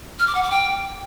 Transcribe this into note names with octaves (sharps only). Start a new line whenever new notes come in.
F6
D6
F#5
D6
G5